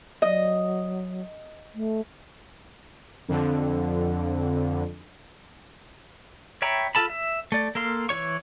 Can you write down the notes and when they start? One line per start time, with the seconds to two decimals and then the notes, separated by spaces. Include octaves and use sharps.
0.22 F#3 D#5
1.75 A3
3.28 F2 D3
6.62 C#5 E5 G5 A#5 B5
6.95 F4 A4 A5 B5
7.10 E5
7.52 A3 D5
7.75 A#3 A4 F5 C6
8.09 E3 F4 C#5 C#6